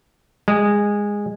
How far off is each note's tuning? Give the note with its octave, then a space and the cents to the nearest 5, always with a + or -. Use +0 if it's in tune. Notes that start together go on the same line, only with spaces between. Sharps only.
G#3 -15